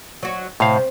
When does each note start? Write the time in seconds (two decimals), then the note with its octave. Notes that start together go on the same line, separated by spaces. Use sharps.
0.23 F#3 F#4
0.60 A2 C3 F5